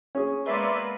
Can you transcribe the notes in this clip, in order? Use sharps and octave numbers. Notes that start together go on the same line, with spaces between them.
C#4 G#4
G#3 A#3 B3 B4 D5 E5 C6